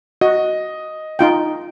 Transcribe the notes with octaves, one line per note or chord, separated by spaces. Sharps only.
F#4 D#5
D#4 F4 G5